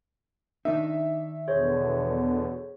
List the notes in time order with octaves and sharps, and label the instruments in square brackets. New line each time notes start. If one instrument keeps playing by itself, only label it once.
[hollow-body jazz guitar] D#3 D4 D#4 [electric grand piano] E5
[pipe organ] E2 B2 D3 [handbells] G#4 C5 C#5